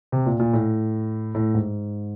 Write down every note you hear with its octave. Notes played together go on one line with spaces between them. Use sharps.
C3
A#2
A#2
A2
A2
G#2